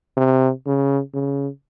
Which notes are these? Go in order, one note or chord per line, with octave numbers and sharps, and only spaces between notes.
C3
C#3
C#3